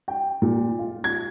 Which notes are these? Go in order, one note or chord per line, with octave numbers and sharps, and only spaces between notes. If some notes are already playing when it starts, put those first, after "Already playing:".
G5
A#2
F4
G#6